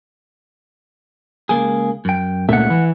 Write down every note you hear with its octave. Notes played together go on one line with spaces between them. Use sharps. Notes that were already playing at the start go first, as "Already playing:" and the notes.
C#2 A#3 G#4
F#2 G5
C#2 A#2 A3 E5 F#5
E3